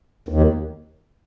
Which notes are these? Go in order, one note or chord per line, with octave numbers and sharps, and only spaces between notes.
D#2